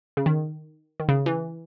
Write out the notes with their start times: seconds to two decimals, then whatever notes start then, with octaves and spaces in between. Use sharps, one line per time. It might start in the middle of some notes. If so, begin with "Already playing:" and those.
0.17 C#3
0.26 D#3
1.00 D#3
1.09 C#3
1.26 E3